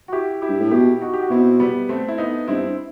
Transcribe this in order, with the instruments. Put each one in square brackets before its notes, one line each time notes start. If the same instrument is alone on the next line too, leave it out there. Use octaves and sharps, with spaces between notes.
[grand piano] F#4
E4 G4
E4 G4
[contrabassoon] G2
A2
[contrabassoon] B2 [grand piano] E4 G4
[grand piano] D#4 F#4
G4
F#4
[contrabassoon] B2 [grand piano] C4 E4
[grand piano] G3 B3
A3 C4
E4
B3 D#4
[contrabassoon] G2 [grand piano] C4 E4